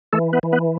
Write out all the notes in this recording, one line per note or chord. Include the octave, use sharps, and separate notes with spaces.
E3 A3 A4
B3 B4
E3
B3 B4